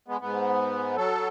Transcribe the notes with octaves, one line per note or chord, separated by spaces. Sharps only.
G#3 B3
G#2 B3
F#3 A4